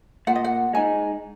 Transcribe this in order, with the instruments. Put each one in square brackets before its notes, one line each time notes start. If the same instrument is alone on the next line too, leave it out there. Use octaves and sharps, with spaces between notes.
[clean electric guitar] A#2 [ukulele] F#5
[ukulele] D#5
F#5
[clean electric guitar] G#3 D#4 [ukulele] G#5